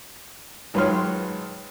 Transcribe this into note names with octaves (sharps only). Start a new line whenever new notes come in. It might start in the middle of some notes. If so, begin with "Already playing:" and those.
G#1 F#3 B4 C#5 C6 F6